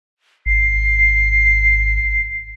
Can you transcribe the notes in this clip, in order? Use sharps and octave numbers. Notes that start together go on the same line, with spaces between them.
G#1 C7